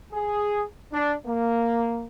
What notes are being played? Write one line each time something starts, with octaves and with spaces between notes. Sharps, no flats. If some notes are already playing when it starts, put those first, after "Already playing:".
G#4
D4
A#3